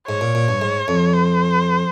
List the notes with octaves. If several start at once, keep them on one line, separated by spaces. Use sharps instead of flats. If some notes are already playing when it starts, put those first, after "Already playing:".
G#2 C#5
A#2
A#2
G2
G#2
F2
C5